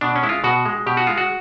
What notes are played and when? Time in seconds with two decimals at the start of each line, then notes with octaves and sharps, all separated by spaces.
0.01 B2 D4
0.16 C#4
0.23 G#3 E4
0.29 F4
0.44 B2 F#4
0.65 G#3
0.86 B2 G4
0.97 F#4
1.07 G#3 F4
1.17 F#4